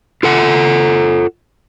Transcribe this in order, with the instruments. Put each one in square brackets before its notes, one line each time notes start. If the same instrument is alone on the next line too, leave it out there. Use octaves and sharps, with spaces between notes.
[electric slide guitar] F4 A4 F#5